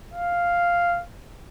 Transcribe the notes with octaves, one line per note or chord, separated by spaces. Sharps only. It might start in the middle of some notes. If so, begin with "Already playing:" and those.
F5